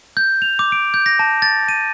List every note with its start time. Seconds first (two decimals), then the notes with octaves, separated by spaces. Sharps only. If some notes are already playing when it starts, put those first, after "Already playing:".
0.17 G6
0.42 F7
0.59 D6
0.72 D7
0.94 G6
1.06 A#6
1.19 A5
1.42 A6
1.69 D#7